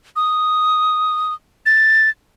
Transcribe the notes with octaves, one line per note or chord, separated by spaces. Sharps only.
D#6
A6